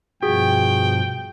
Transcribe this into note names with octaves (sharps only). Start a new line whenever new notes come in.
G2 B2 F3 F#4 G#4 G5